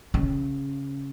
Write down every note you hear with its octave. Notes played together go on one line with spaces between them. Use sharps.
C#3